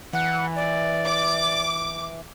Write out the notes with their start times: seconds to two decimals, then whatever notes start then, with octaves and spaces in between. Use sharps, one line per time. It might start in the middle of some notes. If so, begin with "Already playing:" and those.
0.13 E3 F#5
0.55 D5
1.06 D6